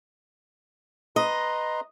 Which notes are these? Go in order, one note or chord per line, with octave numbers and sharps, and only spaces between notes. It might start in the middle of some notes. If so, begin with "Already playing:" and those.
B4 D#5 A#5 C6